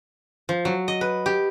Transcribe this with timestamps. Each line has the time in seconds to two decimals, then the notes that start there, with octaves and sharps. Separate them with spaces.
0.49 F3
0.65 F#3
0.88 D#5
1.01 B4
1.26 G4